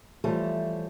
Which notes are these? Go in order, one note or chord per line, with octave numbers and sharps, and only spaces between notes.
E3 F3 G3 A3 C5 C#5